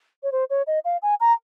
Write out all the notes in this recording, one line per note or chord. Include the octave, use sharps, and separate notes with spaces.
C#5
C5
C#5
D#5
F5
G#5
A#5